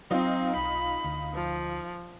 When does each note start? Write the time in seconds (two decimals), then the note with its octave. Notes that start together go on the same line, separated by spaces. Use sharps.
0.11 F#3 C4 D#4 F4
0.56 B1 B5
1.04 D2
1.34 F3